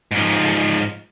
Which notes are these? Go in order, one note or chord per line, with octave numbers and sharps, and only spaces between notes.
G#2 F3